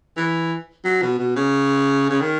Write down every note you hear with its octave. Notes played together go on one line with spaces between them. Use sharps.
E3
F#3
B2
B2
C#3
C#3
D#3